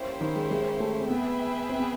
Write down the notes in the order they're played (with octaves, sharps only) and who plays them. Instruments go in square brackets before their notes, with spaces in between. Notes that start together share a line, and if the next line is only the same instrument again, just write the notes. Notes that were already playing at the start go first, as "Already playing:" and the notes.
Already playing: [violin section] A#3 C#4 E4 G4 C5
[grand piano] D#3
G#3
G#3
A3
C4
[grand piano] B3 [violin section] G#4 B4 E5 G5
[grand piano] C4
B3